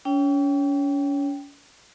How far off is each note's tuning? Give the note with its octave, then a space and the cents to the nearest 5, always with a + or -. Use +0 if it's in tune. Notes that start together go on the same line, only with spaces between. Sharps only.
C#4 +35 C#5 +0 G5 +0